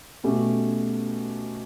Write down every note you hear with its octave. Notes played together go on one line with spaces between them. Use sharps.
B2 A3 C#4 G4